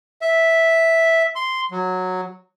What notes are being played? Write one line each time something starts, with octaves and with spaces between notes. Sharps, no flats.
E5
C6
F#3